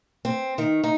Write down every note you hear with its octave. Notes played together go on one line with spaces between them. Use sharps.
C4
D#3
D#4